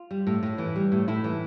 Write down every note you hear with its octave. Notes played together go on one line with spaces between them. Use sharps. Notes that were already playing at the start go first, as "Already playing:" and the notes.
Already playing: F4
G3
A2
A2
E3
G3
A2
A2 E4
E3